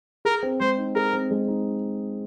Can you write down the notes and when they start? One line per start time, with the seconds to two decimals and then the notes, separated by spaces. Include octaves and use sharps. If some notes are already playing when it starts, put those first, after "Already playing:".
0.25 G#4 A#4
0.43 C4
0.60 G#3 C5
0.78 D#4
0.95 G#4 A#4
1.13 C4
1.31 G#3
1.48 D#4